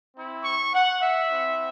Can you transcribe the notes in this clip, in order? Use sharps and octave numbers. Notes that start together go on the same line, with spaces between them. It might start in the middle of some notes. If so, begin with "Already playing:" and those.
C4 E4
C#6
F#5
E5
C4 E4